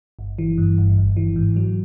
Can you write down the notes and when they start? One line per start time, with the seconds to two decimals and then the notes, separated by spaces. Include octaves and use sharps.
0.19 G1
0.38 E3
0.58 G2
0.78 G1
0.98 G1
1.17 E3
1.36 G#2
1.56 F#3